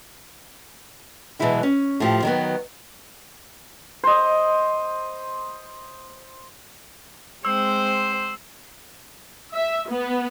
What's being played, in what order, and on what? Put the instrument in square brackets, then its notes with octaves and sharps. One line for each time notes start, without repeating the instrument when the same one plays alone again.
[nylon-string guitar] B2 E3 F#3 G#3 E4 F#4
C#4
A2 F3 G4
D#3 F#3 B3
[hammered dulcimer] C5 D#5
[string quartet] G#3 C4 [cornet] C5 [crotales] E6
[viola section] E5
B3